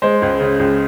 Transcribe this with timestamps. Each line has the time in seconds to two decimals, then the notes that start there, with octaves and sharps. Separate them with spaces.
0.02 G#3 C5
0.22 C#2
0.40 C#3
0.59 C#2